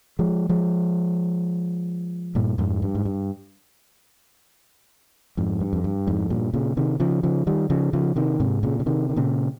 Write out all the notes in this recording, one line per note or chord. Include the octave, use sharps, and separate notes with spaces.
F3 G#3
F3 G#3
G2 A#2
F2 G#2
G2
G#2
G2
F2 G#2
G2
F2
G2
F2 G#2
G2 A#2
A#2 C#3
C3 D#3
C#3 F3
C#3 F3
D#3 G3
C#3 F3
C#3 F3
C3 D#3
G#2 C3
A#2 C#3
C#3
C3 D#3
D#3
A#2 C#3